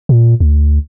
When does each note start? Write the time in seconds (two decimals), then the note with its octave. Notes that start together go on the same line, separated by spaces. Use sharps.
0.09 A#2
0.40 D2